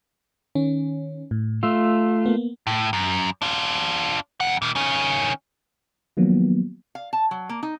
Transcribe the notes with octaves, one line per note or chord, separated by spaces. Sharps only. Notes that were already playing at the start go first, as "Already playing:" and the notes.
D#3 C#4
A2
A3 F4 E6
A#3 B3
A2
F#2
D4 F4
F2 F#5
A#2 D#3
D#3 C#4
D#3 F3 F#3 A#3 B3
F5
A5
F#3
A#3
D#4